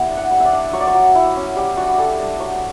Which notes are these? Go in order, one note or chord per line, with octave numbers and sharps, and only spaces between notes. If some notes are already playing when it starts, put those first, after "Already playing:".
Already playing: G3 B3 E4 E5
D4
F#5
G3
E5
D5
D4
F#3 C#5
D5
C#5
F#3
E4
C#4
G3 G4
D4 F#4
G4
G3 A4
D4
F#3 C#5